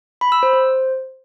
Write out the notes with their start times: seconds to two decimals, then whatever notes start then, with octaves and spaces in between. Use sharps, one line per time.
0.21 B5
0.32 E6
0.43 C5
0.53 C5